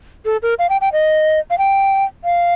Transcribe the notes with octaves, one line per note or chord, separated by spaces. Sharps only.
A4
A#4
F5
G5
G5
D#5
F5
G5
F5